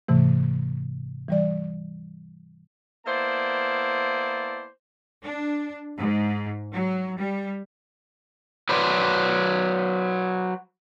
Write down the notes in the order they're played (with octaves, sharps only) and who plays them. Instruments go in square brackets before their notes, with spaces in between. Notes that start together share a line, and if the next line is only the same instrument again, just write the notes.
[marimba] G#2 C3 E3 A3
E3 G3 D5
[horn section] A#3 B3 E4 C5 D5 A5
[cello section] D4
G#2
F#3
G3
[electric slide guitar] F#3 B4 C5 D5